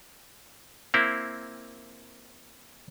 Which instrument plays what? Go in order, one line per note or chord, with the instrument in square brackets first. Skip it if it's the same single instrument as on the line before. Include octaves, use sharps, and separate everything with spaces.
[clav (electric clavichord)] A#3 C4 E4